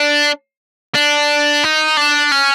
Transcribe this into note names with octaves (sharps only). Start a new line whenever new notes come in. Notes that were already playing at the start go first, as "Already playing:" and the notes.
Already playing: D4
D4
D#4
D4
C#4